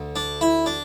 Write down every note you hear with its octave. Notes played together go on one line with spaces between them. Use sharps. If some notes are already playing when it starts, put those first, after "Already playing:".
Already playing: D2 D3
D4
E4
D4